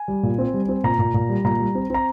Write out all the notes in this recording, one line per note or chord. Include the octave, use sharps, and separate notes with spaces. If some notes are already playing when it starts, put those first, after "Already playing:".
Already playing: G#5
G3
A#2
C4
G3
C4
A#2 A#5
A#2
A#2
G3
A#2 A#5
G3
C4
C4 A#5